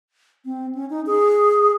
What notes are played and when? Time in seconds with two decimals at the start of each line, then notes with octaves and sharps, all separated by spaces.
0.45 C4
0.75 C#4
0.90 D#4
1.06 G#4